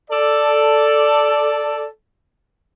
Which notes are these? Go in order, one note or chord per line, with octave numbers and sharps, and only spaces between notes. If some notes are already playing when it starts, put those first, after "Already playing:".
A4 D5